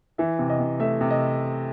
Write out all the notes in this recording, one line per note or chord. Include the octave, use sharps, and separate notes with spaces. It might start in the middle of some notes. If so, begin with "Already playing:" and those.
E3 E5
C3
D#5
C3
A3 E5
C3
D#5